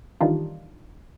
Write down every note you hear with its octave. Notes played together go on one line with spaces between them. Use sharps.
D#3 E3 G3 D4 D#4 F4